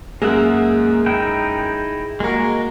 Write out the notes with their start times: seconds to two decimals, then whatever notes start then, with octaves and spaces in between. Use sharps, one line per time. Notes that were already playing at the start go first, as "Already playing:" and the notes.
0.22 F#2 G#3 A#3 G#4 A#4 E5 F#5
1.06 D#4 E4 G5
2.20 G#3 A#3 F#4 A#4